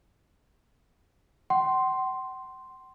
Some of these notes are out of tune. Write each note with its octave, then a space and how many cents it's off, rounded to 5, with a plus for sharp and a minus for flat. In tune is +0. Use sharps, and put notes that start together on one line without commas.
F#5 +45 C6 +0